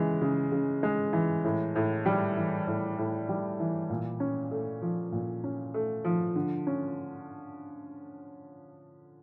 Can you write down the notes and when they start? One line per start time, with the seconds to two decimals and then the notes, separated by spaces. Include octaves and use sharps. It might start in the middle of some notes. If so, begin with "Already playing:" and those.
Already playing: C#3 E3 G#3
0.21 C#3
0.52 C#3
0.83 G#3
1.13 E3
1.44 A2
1.76 A2
2.06 G3
2.37 E3
2.67 A2
2.98 A2
3.29 G3
3.60 E3
3.90 A#2
4.20 C#4
4.51 A3
4.81 F3
5.12 A#2
5.44 C#4
5.74 A3
6.04 F3
6.36 D3
6.67 C#4